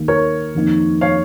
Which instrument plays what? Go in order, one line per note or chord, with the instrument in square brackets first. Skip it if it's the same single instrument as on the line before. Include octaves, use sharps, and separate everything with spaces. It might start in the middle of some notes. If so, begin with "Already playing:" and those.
Already playing: [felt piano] D#2 D#3 A#3
[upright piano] A#4 C#5
[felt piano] F2 D#3 A#3 D#4
[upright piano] C#5 F5